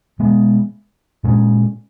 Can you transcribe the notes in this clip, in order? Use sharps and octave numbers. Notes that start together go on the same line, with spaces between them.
B2 G#3 B3
A#2 G#3 C#4